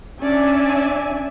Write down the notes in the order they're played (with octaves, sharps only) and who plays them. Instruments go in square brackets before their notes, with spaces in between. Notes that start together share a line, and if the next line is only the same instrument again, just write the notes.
[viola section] C#4 D4 D5 E5 G#5